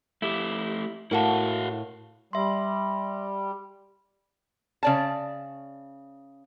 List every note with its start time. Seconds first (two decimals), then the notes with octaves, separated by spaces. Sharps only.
0.22 A3 E4 G4
1.11 A2 E4 F#4 A#4 F5 F#5 A5
2.33 G3 E5 C6
4.83 C#3 D5 A5